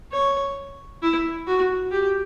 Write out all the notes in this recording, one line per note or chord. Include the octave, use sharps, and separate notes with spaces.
C#5
E4
F#4
G4